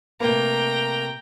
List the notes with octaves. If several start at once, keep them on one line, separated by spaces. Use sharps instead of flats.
C3 A3 A#3 B4 G5 A#5